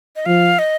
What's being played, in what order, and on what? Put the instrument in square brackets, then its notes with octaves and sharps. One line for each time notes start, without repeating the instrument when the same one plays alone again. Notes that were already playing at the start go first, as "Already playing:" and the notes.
[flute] D#5
[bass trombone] F3 [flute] F5
[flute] D#5